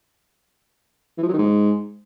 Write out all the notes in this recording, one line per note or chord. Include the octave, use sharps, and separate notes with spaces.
E3
F3
F#3
D#3
G#2